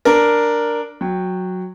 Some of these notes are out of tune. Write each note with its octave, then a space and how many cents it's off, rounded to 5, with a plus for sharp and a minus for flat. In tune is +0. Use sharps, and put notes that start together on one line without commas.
D4 +0 A#4 +0
F#3 -10 G5 +0